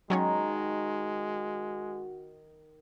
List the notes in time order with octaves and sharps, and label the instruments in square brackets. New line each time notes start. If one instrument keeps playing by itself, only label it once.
[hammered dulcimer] D#3 [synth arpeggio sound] F#3 C#4 C#5 [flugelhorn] G#3 [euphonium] F#4